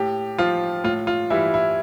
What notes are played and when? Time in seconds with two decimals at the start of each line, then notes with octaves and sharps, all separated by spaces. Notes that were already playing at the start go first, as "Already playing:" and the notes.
Already playing: A2 G4
0.38 F3 F4
0.84 A2 F4
1.07 F4
1.30 E3 G3 E4
1.54 E4